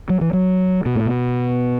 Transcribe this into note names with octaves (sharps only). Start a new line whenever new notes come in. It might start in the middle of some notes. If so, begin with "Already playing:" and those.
F#3
E3
F#3
B2
A2
B2